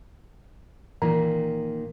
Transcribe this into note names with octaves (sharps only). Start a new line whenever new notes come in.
A#2 D#3 E3 A#3